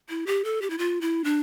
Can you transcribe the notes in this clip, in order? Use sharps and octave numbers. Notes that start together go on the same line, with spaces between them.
E4
G4
A4
G4
E4
F4
E4
D4